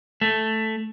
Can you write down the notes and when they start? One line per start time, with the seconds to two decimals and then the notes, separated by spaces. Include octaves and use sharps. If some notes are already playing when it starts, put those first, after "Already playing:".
0.21 A3